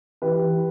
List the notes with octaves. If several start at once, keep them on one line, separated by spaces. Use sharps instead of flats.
E3 G4 B4
E3